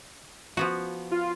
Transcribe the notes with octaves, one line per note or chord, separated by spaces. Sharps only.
F3 B3 F#4
F4